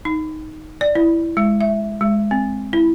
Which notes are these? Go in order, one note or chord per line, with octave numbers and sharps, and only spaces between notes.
D#4
D5
E4
G#3
E5
G#3
C4
E4